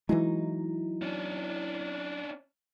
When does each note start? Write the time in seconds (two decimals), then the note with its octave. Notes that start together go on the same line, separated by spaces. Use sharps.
0.09 E3 F#3 G#3 D#4 E4
1.02 C#4 D4